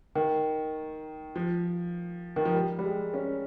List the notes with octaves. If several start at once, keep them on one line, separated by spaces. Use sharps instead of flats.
D#3
F3
D#3
F3
G3
G3
G#3
C#4